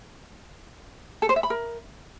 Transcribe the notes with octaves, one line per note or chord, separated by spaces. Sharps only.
A4
C5
E5
B5
A#4